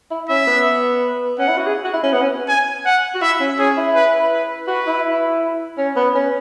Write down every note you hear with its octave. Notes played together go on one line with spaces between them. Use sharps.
E4
C#4 E5
B3
C#4 F#5
E4
F#4
G#4
F#4
E4
C#4
B3 F#5
C#4
G#5
F#5
F#4
E4 E5
C#4
C#4 G#4
E4
B4
B4
F#4 B4
E4
C#4
B3
C#4